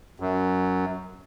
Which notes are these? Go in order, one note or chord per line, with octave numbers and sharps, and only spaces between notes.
F#2